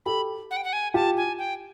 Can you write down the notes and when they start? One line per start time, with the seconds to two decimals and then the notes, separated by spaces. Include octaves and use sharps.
0.06 G4 A4 B5
0.51 F#5
0.57 G5
0.64 F#5
0.73 G#5
0.94 F4 G4 A5
1.17 G#5
1.38 G5